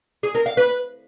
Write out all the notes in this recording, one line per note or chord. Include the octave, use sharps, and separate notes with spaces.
G#4
A#4
F5
B4